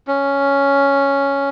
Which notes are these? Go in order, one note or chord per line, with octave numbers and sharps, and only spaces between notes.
C#4